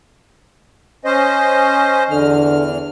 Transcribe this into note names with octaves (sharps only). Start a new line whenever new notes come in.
C#4 C5 D#5
E2 D3 F6